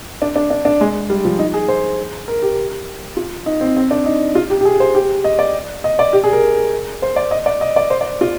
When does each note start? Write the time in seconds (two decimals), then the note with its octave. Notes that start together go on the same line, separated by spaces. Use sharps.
0.22 D4
0.36 D4
0.50 D4
0.65 D4
0.81 G#3
1.10 G3
1.25 F3
1.39 D#4
1.54 G#4
1.68 C5
2.28 A#4
2.43 G4
3.17 F4
3.46 D#4
3.61 C4
3.77 C4
3.91 D4
4.06 D#4
4.35 F4
4.50 G4
4.61 G4
4.65 G#4
4.80 C5
4.95 G4
5.24 D#5
5.39 D5
5.84 D#5
5.99 D5
6.13 G4
6.24 G#4
6.33 A#4
7.02 C5
7.16 D5
7.31 D#5
7.46 D5
7.61 D#5
7.76 D5
7.90 C5
8.01 D5
8.21 F4